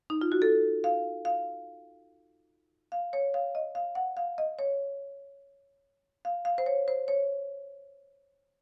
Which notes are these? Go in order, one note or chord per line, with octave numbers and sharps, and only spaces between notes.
D#4
F4
F#4
A4
F5
F5
F5
C#5
F5
D#5
F5
F#5
F5
D#5
C#5
F5
F5
C5
C#5
C5
C#5